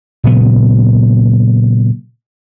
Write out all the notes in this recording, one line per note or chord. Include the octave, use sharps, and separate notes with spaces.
A#2 C#3 F#3 B3